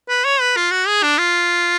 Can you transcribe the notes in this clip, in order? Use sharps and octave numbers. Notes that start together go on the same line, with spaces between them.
B4
C#5
B4
F4
F#4
G#4
D4
F4